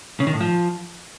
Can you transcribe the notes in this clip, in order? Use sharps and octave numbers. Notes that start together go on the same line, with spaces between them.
C#3
D#3
A2
F3